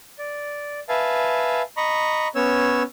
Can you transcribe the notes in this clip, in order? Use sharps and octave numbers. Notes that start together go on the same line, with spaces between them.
D5
B4 E5 F5 G#5 A5
D#5 A#5 B5 C#6
B3 C#4 C#5 E6